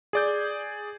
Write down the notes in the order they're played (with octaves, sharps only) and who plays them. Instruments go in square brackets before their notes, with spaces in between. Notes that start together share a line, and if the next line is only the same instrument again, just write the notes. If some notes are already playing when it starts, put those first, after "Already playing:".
[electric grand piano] G#4 D5 G6